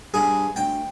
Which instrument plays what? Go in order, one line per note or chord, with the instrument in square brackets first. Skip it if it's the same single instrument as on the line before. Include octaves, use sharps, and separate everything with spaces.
[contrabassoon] G2 [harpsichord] G#4
[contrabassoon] D2 [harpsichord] G5